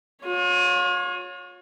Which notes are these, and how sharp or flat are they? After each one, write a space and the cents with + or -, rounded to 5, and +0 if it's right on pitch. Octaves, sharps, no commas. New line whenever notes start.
F4 +45 C#5 +0